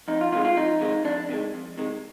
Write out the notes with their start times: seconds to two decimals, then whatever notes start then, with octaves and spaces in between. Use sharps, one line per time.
0.08 F2 D#4
0.21 F4
0.32 C3 D#3 G#3 F4
0.45 F4
0.57 F2 D#4
0.81 C3 D#3 G#3
1.05 F2 D4
1.29 C3 D#3 G#3
1.54 F2
1.78 C3 D#3 G#3